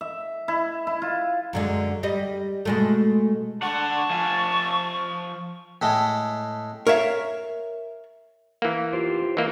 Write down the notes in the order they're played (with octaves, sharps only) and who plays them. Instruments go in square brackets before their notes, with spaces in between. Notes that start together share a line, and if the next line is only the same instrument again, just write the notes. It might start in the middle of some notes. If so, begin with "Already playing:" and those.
[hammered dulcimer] E5
E4
E4
F4
[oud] F#2 D3 G#3
G3 D#5
B2 G#3 A3
[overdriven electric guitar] D3 F#5 [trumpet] A5 [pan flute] C#6
[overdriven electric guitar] F3 G#5
[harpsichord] A2 G#3 A3
[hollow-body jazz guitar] A#4 C#5 E5 F5
[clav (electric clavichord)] E3 A#3
[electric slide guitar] F4 G4 C5
[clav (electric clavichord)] E3 A#3 [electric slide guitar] D#5